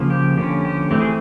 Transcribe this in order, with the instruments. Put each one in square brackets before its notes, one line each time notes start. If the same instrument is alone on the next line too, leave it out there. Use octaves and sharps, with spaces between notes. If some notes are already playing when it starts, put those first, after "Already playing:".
Already playing: [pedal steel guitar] C#3 F3 A#3
G4
D3 F3 A#3 C#4 G4
G4
E3 A3 C4 G4
G#4